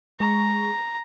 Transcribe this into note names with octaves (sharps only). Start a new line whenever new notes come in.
G#3 G#4 A#5 C#6